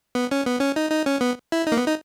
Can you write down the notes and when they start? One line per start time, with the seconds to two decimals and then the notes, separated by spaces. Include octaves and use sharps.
0.15 B3
0.31 C#4
0.46 B3
0.60 C#4
0.76 D#4
0.91 D#4
1.06 C#4
1.21 B3
1.52 E4
1.67 D#4
1.72 A#3
1.77 B3
1.87 D#4